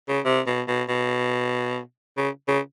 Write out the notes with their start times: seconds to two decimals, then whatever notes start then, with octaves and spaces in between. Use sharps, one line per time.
0.09 C#3
0.25 C3
0.47 B2
0.68 B2
0.89 B2
2.17 C#3
2.48 C#3